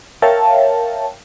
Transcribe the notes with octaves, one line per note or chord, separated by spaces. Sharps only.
A#4 C#5 E5 F5 G5 A5